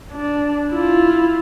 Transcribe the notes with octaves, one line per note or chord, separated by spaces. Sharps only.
D4
E4 F4